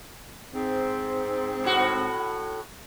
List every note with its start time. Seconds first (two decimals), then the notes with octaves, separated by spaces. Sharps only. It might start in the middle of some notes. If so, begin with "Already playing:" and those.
0.54 G#2 C4
1.64 A2 F#4